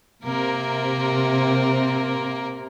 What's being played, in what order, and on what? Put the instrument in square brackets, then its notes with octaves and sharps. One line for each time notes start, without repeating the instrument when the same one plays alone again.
[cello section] C3 [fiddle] A#3 A#4